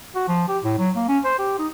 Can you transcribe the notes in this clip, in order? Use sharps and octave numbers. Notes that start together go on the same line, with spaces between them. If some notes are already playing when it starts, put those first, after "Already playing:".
F#4
F3
G4
A2
F#3
A#3
C#4
C5
G4
D#4